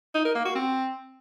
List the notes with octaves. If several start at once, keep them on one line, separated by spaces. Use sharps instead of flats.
D#4
A#4
A#3
F#4
C4